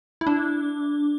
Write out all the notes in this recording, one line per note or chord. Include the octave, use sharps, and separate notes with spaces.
E4
D4